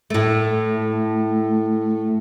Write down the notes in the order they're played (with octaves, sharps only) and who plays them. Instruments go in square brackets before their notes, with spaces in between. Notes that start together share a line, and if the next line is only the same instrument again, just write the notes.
[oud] A2 A3